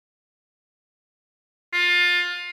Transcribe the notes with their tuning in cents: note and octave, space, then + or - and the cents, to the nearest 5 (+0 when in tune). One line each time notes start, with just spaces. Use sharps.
F4 +20